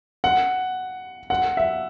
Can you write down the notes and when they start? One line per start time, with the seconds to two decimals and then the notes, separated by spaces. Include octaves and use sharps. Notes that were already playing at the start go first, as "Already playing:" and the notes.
0.24 F#5
1.30 F#5
1.57 E5